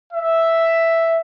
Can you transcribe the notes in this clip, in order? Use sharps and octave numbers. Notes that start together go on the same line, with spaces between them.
E5